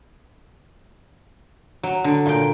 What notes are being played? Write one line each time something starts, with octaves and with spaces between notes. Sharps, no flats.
F#3
D3
A#2 G5